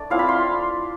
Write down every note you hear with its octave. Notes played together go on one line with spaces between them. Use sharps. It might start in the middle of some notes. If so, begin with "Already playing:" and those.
Already playing: A3 D4 D5
F3 C4 E4 F5
B5
C6